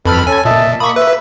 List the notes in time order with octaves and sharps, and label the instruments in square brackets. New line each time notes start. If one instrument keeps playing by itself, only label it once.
[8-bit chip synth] F2 B5 F6 [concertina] A4 B4
[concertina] C#4 A4 [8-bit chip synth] G#5
[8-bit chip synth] A#2 [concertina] D#5 E5 A5
[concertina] A#3 D#6 [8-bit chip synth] B5 C#6
[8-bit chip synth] B4 [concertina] E5